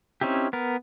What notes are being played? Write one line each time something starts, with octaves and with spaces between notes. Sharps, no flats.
C4 C#4 D#4 E4 G4
B3 A#4